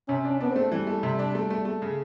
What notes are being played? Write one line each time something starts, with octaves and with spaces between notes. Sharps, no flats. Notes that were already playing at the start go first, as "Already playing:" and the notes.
C3 C#4
D4
C#4
B3 D4
C4
A3
E3 G3
A3
C3
D4
A3
A3
A3
C#3